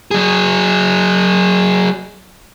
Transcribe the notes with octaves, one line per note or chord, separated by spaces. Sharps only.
F#3 G#4